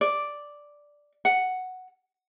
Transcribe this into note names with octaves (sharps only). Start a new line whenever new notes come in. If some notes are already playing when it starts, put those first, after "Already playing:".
D5
F#5